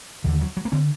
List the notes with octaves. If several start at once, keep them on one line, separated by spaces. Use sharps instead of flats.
D#2 D3 D#3
F#3
F#3
A#3
D3 C4